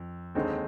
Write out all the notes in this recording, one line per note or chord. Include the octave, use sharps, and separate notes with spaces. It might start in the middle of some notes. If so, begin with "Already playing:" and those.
Already playing: F2
D#2 D3 G#3 C4 D#4